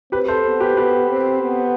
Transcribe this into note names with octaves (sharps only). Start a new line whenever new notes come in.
C4 G4 B4
A4 C5
B3
G4 B4
B3 G4 B4
C4
B3